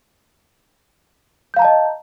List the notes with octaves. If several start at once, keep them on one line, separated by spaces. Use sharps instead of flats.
D#5 F5 A5 A#5 G6